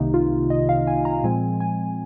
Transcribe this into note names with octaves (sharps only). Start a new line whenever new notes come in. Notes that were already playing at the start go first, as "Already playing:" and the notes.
Already playing: C2 C3 D#3 A#3 D#4
F4
D#5
D#5
F5
G#5
A#5
A#2 F3 G#3 C4 G#5
G#5